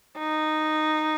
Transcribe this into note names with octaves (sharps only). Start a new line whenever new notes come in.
D#4